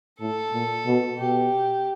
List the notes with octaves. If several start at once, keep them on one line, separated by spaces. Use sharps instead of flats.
A2 A4
A#2
B2
B2 G4